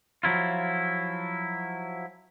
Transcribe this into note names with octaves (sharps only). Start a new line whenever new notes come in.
F3 F#3 E4 F4